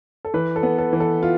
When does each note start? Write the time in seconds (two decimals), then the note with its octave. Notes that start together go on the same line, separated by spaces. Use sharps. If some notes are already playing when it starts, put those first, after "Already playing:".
0.25 A4
0.34 E3 B4
0.56 A4
0.63 B3
0.78 A4
0.93 E3
1.00 A4
1.23 F4